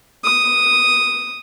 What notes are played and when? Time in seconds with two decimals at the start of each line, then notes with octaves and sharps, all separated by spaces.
0.24 D#6